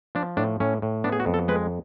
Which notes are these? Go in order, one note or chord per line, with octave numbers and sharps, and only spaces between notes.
F3 D4
A2 D4
A2 C#4
A2
B3 D4
G#4
F#4
F2
A4
G#3 B4